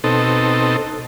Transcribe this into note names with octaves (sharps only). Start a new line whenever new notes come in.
B2 C4 D#4 A4